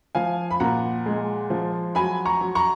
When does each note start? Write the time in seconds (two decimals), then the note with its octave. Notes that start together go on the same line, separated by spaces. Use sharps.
0.15 F3 F5 G#5
0.51 B5
0.60 A#2 F#5 A#5
1.06 G#3
1.50 F3
1.95 F#3 G#5 B5
2.25 A#5 C#6
2.41 F#3
2.55 A#5 C#6